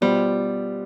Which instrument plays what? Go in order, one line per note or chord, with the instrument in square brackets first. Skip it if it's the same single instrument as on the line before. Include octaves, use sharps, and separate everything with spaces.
[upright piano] B2 B3 F4 C5 [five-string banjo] G3